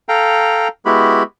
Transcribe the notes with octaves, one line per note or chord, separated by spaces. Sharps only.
A4 F5 G5 A#5
G#3 B3 E4 F#4 G4 B5